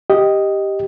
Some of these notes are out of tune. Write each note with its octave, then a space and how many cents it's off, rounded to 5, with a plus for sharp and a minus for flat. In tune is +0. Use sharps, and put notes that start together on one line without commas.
G4 +0 D#5 +0